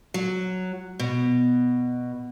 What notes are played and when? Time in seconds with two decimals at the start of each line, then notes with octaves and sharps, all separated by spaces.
0.14 F#3
0.99 B2